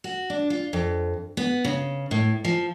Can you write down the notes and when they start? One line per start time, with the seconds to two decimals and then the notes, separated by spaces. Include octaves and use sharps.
0.04 F#4
0.30 D4
0.50 F4
0.73 F2
1.37 B3
1.64 C#3
2.11 A2
2.45 F3